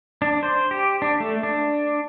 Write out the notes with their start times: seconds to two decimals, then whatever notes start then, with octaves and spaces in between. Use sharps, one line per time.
0.22 D4
0.43 C5
0.71 G4
1.02 D4
1.20 A3
1.43 D4